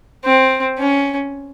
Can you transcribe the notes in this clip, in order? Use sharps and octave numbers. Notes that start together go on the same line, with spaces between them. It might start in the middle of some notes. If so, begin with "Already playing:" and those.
C4
C#4